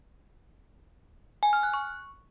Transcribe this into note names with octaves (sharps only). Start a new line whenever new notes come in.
G#5
F6
F#6
C#6